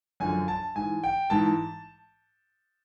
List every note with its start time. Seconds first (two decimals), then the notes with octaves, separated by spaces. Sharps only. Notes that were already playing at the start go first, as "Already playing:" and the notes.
0.20 F#2 D3 F3 G#5
0.48 A5
0.75 G#2 E3 G#5
1.04 G5
1.30 G#2 E3 A5